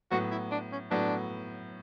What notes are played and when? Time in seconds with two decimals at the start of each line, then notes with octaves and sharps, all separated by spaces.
0.11 A2 F#3 B3 F#4
0.31 E4
0.52 D4
0.72 C#4
0.91 A2 F#3 B3 D4